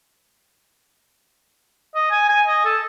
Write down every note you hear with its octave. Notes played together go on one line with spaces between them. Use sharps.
D#5
G#5
G#5
D#5
A4